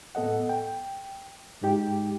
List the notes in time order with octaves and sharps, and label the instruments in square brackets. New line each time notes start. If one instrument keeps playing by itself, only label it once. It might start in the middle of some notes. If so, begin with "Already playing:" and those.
[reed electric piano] A2 B3 A4 D#5 F#5
G5
G#2 G#3 D#4 G4 G5